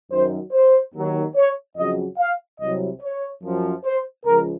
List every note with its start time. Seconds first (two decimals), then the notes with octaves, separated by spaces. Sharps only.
0.11 F#2 D#3 F#3 C5
0.52 C5
0.95 D#2 D#3 F#3
1.36 C#5
1.77 F2 C#3 F#3 D#5
2.18 F5
2.61 C2 C3 F#3 D#5
3.01 C#5
3.43 F#2 F3
3.85 C5
4.25 C#2 C#3 F3 A#4